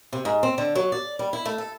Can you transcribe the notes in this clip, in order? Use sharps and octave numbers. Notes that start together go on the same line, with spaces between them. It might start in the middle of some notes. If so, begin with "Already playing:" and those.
C3
G#2
C4
D3
F#3
D5
G3
E4
A3
A4